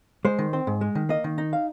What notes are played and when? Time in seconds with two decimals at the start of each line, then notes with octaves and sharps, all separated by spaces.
0.25 G#3 C5
0.39 D#3
0.53 C4
0.67 G#2
0.81 G#3
0.95 D#3
1.09 A#3 D#5
1.24 D#3
1.38 D#4
1.53 F5